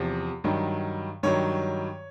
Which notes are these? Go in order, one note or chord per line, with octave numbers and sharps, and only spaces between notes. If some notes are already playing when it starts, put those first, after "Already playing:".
Already playing: E2 C3 F3
G2 D#3 F#3
G2 D#3 F#3 C#5